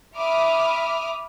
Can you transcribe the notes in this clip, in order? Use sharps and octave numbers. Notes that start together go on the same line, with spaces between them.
E5 B5 D6 D#6 F6